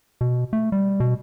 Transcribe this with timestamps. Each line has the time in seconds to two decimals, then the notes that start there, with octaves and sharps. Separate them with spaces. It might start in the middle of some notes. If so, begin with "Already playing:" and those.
0.21 B2
0.53 A3
0.72 G3
1.00 B2